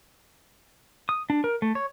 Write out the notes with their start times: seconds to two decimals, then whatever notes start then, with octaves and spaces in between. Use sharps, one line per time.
1.09 D#6
1.30 D4
1.44 A#4
1.62 A3
1.75 C#5